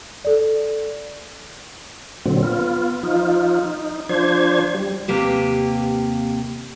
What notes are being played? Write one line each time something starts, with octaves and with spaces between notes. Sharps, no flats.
A4 D5
A#2 D3 F#3 C4
B3 F4
F3 D#4 F4
D#4
F3 D4 C5 G#6
G3
D#2 C3 A#3 G4 B4